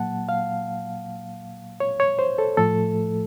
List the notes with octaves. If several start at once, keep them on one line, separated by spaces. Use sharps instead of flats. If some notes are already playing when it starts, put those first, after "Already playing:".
Already playing: A#2 F#3 A#3 F#5 A5
F5
C#5
C#5
C5
A4
A2 F3 A3 A4